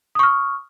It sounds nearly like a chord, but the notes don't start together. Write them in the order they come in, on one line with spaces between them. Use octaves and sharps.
D#6 C#6 F6